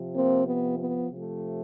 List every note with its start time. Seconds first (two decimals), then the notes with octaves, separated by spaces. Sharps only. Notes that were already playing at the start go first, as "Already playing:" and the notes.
Already playing: C3 F3
0.15 A#3 C4
0.46 B3
0.79 B3
1.11 C3 F3 A3